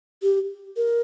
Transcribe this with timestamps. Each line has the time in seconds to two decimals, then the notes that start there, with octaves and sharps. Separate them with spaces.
0.22 G4
0.77 A#4